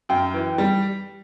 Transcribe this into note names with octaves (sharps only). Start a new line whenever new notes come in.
F#2 G5
E3
G3